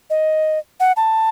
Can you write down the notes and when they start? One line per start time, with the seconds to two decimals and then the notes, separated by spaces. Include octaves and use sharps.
0.10 D#5
0.80 F#5
0.97 A5